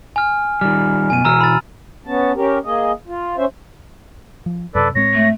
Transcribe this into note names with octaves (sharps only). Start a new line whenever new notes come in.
G#5 F6
D#3 G3 F6
F#2 B2 G#5 D#7
B2 E3 F#4 A#5 E6 F6
B5 A6
B3 C#4 A5
C#4 G4 A#4
A#3 G#4 D#5
F4
C#4 C5 E5
F3
F#2 C3 A4 B4 D5
A2 G#3 C4 C#5 A#6
A3